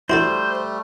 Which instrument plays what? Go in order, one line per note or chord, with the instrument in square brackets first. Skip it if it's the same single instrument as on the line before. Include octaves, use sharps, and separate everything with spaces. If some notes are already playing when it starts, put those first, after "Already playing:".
[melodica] G3 A3 [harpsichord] E4 F#4 A4 [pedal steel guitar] C5